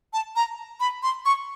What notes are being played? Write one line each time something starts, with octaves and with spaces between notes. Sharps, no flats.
A5
A#5
B5
C6
C#6